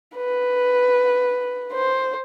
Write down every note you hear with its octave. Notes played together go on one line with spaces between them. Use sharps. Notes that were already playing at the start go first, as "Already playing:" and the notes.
B4
C5